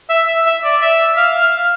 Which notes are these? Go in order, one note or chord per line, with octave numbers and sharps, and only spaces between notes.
E5
E5
E5
D5
E5
F5
F5